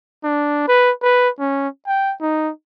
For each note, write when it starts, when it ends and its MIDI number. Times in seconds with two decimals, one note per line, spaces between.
0.24 0.67 62
0.68 0.91 71
1.03 1.29 71
1.39 1.68 61
1.87 2.14 79
2.21 2.51 63